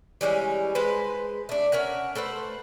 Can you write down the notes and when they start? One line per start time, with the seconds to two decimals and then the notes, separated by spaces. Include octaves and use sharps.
0.21 E3 G3 G#3 C#4
0.75 G#3 B4 C5
1.49 A3 D4
1.72 C#4 A#4 E5 F#5
2.15 A3 A4 B4 C5